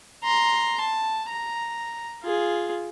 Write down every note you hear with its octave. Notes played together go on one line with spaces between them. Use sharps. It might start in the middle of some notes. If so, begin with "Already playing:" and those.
A#5 C6
A5
A#5
F4 G#4